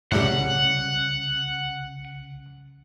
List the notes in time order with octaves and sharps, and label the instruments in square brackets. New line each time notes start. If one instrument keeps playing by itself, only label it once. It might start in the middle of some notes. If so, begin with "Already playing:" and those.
[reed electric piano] C2 C#3 [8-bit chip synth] F#2 A2 G3 [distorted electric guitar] F#5